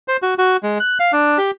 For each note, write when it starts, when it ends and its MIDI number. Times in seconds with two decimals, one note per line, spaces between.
0.08 0.17 72
0.22 0.34 66
0.38 0.57 66
0.63 0.78 56
0.80 0.98 90
1.00 1.12 77
1.12 1.38 62
1.38 1.51 67